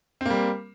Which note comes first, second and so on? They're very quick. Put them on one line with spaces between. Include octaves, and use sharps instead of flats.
C4 A#3 G3